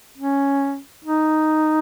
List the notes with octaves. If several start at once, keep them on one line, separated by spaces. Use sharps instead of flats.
C#4
D#4